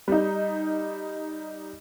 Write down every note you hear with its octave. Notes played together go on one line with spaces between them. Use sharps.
G3 D#4